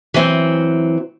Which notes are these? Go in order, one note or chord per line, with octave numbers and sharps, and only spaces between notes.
E3 F#3 C4